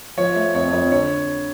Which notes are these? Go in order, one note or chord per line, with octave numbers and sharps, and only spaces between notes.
F3 C#5
A3
F2 C#5
F2
D3 C#5